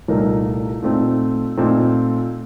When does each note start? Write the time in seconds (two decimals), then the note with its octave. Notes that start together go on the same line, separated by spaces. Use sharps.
0.08 C2 A#2 A3 D#4 A#4
0.82 A#2 A3 C4 D#4
1.57 A#2 A3 C4 D#4